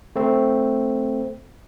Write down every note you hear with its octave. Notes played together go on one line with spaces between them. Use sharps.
A3 C4